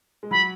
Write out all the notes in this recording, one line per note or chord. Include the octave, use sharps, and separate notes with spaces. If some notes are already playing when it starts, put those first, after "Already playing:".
G#3
F#3 B5